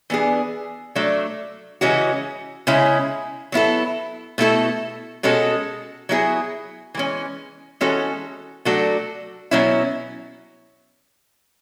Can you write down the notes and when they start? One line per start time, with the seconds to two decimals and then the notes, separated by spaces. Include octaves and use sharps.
0.10 E3 B3 D4 G#4
0.95 F#3 A3 D4
1.81 C#3 E3 G#3 C#4 F#4
2.67 C#3 G#3 C#4 E4
3.52 F#3 B3 E4 A4
4.38 B2 A3 E4 A4
5.23 B2 G#3 C#4 F#4 A4
6.09 F#3 B3 E4 G#4
6.94 E3 G#3 C#4
7.81 E3 G#3 C#4 F#4 A4
8.65 F#3 A3 D4 F#4 A4
9.51 B2 F#3 A3 C#4 E4